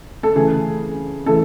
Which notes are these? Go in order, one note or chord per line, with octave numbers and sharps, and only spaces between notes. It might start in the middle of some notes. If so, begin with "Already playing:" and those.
A4
C#3 E3 A3 G#4
C#3 E3 A3 A4